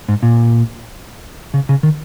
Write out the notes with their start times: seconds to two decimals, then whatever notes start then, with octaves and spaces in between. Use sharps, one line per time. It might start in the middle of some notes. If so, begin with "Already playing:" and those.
0.08 G#2
0.23 A#2
1.54 C#3
1.69 C#3
1.83 D#3